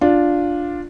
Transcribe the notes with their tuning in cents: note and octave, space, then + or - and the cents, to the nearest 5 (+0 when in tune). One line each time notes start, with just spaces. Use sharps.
D4 +0 F4 +5